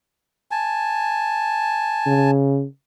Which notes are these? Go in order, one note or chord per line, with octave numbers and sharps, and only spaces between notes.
G#5 A5
C#3